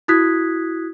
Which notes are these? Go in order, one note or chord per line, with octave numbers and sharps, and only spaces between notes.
E4 F#4 D#6 F#6 G#6 B6